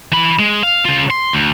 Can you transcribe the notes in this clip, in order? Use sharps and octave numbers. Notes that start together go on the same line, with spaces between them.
E3 B5
G#3
F5
C#3 F4
C6
D2